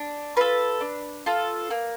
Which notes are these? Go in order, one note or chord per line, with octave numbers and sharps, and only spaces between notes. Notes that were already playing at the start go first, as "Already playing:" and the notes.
Already playing: D4
F4 A4 B4
D4
F4 A4
A#3